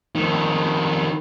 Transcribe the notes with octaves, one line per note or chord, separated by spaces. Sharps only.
F2 D#3